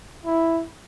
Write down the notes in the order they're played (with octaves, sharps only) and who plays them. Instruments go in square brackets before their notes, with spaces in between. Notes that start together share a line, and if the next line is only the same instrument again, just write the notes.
[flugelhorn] E4